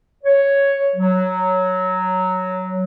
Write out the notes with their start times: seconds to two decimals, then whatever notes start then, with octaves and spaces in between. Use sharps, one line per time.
0.24 C#5
0.96 F#3